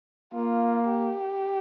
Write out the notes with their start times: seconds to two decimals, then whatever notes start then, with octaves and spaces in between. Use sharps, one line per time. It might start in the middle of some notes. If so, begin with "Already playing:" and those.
0.34 A#3 F4
0.89 G4